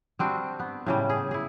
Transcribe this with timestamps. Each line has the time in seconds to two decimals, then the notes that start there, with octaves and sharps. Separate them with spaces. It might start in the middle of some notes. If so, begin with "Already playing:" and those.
0.19 G3 C4 D4 F#4
0.59 B3
0.86 A2 C#3 G3
1.09 G#4
1.31 E4 G#4